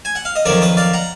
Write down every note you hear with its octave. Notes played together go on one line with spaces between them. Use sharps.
G#5
F#5
F5
D#5
F2 D#3 F#3 A#4 D5
B4 D#5
D5 F5
F#5 A#5